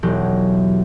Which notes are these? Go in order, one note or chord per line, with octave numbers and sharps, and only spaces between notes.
E1 F#3 G4